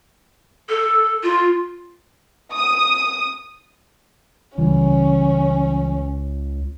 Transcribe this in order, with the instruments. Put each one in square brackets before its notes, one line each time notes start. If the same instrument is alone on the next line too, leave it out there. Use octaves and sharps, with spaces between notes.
[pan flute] A4
F4
[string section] D#6
[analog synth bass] C#2 [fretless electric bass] C#3 E3 G3 [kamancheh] C#4